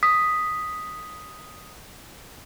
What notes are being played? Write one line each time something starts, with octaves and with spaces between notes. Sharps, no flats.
D#6 B6